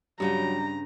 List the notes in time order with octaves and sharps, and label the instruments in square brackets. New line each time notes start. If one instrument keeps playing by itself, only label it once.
[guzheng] G2 C#3 G5 [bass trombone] F#3 [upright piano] G3 [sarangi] A#5